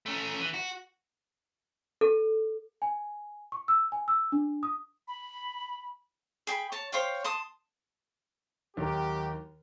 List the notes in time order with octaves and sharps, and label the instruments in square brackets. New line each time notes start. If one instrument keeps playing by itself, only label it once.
[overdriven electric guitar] A3 C#4
E3
F#4
[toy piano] A4
[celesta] G#5
C#6
E6
G#5
E6
D4
D#6
[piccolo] B5
[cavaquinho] G#4 G5 G#5 B5
C#5 A5
C5 C#5 F5 G5
A5 C6 D#6
[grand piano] D#2 A#4 [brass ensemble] F#3 G4